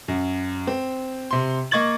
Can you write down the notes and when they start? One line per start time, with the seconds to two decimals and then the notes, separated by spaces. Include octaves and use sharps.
0.08 F#2
0.67 C4
1.31 C3 C6
1.71 A#3 D#5 C#6 G#6 A6 F#7